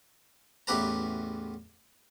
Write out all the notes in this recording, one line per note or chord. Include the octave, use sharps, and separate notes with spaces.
A1 E2 G4 B4 A#5